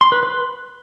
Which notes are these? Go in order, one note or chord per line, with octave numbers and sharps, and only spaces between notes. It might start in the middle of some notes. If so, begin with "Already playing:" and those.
C6
B4
B4